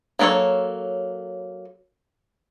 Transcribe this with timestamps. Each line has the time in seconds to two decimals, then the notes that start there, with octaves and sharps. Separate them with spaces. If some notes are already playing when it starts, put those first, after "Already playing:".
0.19 F#3 A#3 D4 A4 C#5